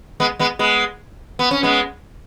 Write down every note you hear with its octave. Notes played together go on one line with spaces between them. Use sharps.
G#3 B3
G#3 B3
G#3 B3
B3
C#4
G#3 B3